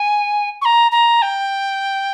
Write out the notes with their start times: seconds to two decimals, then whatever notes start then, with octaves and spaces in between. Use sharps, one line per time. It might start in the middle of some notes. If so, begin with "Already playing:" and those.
Already playing: G#5
0.62 C#6
0.65 A#5
0.92 A#5
1.22 G5